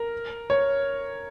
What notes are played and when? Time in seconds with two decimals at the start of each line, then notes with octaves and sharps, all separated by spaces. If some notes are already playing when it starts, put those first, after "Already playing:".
Already playing: A#4
0.50 C#5